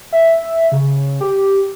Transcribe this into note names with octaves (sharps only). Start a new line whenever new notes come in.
E5
C#3
G4